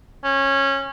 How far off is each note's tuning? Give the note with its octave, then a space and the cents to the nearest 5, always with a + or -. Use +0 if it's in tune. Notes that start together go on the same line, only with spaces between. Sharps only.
C#4 -15